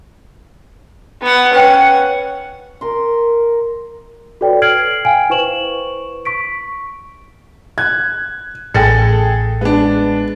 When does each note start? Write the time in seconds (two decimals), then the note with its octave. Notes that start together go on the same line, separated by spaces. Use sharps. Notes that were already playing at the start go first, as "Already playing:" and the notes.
1.22 B3 F#5
1.53 C#4 B4 F#5 G5
2.81 A#4 C6
4.41 F#4 A4 B4 C#5 D5 G5
4.62 F6 G#6 C7 D7 F#7
5.05 F5 G5 G#5 D7
5.30 E4 B4 C5 C#6 E7 F#7
6.25 C#6 B6 D7
7.78 F#6 G#6
8.74 A1 G#4 A4 G5 A6 A#6 C#7
9.61 G#3 B3 D4